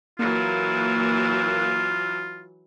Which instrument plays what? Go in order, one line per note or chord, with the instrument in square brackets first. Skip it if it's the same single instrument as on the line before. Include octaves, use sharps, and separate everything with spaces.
[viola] E3 F#3 [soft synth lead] A#3 [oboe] F4